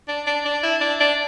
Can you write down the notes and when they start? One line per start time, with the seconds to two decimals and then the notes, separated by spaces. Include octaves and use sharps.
0.08 D4
0.27 D4
0.45 D4
0.63 E4
0.81 D4
1.00 D4